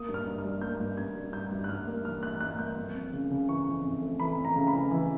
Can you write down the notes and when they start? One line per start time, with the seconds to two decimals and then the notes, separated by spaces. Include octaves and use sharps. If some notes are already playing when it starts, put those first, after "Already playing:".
Already playing: A#3 D#6
0.09 G2
0.14 F6
0.27 G2
0.38 F6
0.45 G3
0.62 A#3 G6
0.80 G2
0.97 G2 G#6
1.15 G3
1.33 G2 G6
1.51 G2
1.64 F#6
1.69 G2 F6
1.87 A#3
2.05 E3 F6
2.23 A#3 F#6
2.41 G2 F#6
2.59 A#3 G6
2.76 F2
2.95 F2
3.13 C#3
3.31 C#3
3.48 E3 C#6
3.66 F2
3.85 F2
4.02 A3
4.20 E3 B5
4.38 F2
4.45 A#5
4.56 C#3
4.67 B5
4.73 E3
4.91 E3